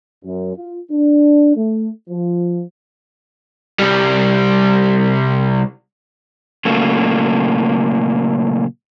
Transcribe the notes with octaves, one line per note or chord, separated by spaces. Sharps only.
F#2
F4
D4
A3
F3
C2 G3
A#2 C#3 F#3 A3 A#3